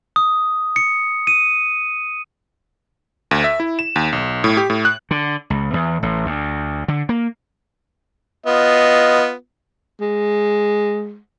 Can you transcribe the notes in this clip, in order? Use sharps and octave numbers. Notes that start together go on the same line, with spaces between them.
D#6
C#7
D#7
D2
E5
E4
E7
D#2
B1
A2
G4
A2
F#6
D3
C#2
E2
A1
D2
D3
A#3
B3 F4 D#5
G#3